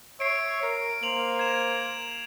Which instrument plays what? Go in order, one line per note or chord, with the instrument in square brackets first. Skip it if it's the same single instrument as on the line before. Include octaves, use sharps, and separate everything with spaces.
[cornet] C#5 [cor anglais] E5 [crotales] C7 D7
[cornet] A#4 [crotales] C7
[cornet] A#3 [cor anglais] C5 [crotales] F7 F#7
[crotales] G#6 E7